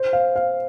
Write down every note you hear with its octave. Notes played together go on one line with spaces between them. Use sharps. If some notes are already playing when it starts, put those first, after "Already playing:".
Already playing: C5
F5
F5